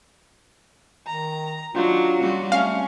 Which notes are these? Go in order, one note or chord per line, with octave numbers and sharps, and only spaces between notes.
D#3 A#5
F#3 D4 D#4 F4
G3 C#4 F#4
A3 C4 C#4 F5